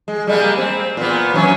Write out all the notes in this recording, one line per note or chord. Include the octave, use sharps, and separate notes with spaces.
G#3
G3 G#3 A#3
C4
A#2 B3
E3 F#3 C#4